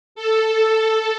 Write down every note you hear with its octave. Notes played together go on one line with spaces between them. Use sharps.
A4